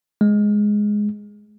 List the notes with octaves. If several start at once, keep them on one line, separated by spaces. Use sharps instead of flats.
G#3